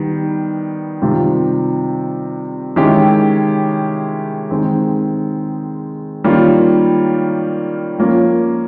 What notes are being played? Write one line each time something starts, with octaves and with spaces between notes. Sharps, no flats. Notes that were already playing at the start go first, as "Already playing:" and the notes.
Already playing: D#3 G3 B3
C3 D#3 G3 C4 F4
D#3 G#3 C#4 E4 G4
D#3 G#3 C4
D#3 G3 A#3 C#4 F4
F3 A#3 C#4 F4